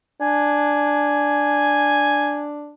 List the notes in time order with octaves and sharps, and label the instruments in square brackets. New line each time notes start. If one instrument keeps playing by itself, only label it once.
[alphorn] D4 [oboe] G#5